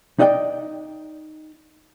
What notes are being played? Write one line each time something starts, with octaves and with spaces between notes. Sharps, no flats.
D#4 D5 D#5 F#5 G5